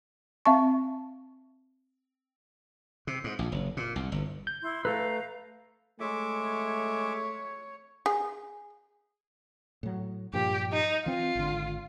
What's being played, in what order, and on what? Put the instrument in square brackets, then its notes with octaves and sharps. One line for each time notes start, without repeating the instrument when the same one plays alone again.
[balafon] C4 E5 F5 A5 C#6
[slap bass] C3
G#2
A#1
F#1
A#2
C2
G1
[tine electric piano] G6
[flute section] E4 C6
[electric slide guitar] A3 A4 B4 [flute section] F5 A#5
[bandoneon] G#3 E5 D6 [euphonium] A3 [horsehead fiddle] C#5
[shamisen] G#4
[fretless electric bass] A2 F#3
[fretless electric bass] G2 A#2 F3 [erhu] G4
[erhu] D#4
[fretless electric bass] E3 C4 [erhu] F4
[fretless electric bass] G#1 D3